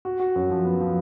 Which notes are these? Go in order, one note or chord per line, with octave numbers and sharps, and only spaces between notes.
F#4
F#4
F#2
F3
B3
F3